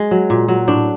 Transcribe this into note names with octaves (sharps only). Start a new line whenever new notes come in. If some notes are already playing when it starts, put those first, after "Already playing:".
Already playing: G#3
F#3
A#2
F#3
A2 D4